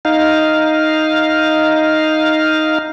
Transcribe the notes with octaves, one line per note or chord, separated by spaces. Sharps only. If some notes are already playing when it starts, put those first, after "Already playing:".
D#4 F5